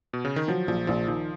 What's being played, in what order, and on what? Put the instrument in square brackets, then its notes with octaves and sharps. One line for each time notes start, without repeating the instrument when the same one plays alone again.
[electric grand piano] B2
C#3
D#3
[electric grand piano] F3 [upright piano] F#3
[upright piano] A#1 [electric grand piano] F3
[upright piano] A#1 [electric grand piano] F3
[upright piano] D#3 [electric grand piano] F3